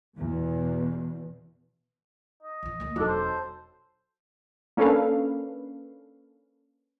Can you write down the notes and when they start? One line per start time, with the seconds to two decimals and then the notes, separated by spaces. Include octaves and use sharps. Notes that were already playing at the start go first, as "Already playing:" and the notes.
0.17 E2 B2
2.43 D#5
2.63 A#1 F3
2.80 D2 A#3
2.96 E1 F#3 C4 D4 D#4 A4
3.07 C5
4.77 A#3 C#4 D4 A4 B4 F5